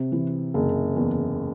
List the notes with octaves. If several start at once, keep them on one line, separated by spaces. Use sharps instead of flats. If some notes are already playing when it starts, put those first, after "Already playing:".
Already playing: C3
E3
F#1
E2